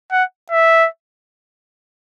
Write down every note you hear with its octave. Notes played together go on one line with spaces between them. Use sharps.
F#5
E5